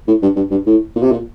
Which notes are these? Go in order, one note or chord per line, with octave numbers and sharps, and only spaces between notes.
A2
G2
G2
G2
A2
A#2
C3
A#2